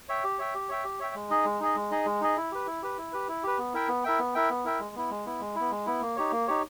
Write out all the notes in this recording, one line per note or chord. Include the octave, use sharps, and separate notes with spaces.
C#5 E5 G5
G4
C#5 E5 G5
G4
C#5 E5 G5
G4
C#5 E5 G5
G#3
D#4 G#4 D#5
G#3
D#4 G#4 D#5
G#3
D#4 G#4 D#5
G#3
D#4 G#4 D#5
E4
G4 B4
E4
G4 B4
E4
G4 B4
E4
G4 B4
B3
E4 A#4 E5 G5
B3
E4 A#4 E5 G5
B3
E4 A#4 E5 G5
B3
E4 A#4 E5 G5
G#3
B3 E4
G#3
B3 E4
G#3
B3 E4
G#3
B3 E4
A#3
D#4 G4 C#5
A#3
D#4 G4 C#5